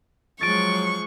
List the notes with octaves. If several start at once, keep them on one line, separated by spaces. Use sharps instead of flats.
F3 F#3 G#3 C#6 A6 D7